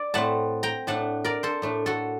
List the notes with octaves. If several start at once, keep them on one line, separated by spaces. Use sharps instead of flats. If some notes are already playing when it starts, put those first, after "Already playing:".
Already playing: D5
A2 A3 C4 F#5 A5
G5 A#5
A2 A3 D4 F#5 A5
A#4 D5
A4 C5
A2 A3 D4
F#4 A4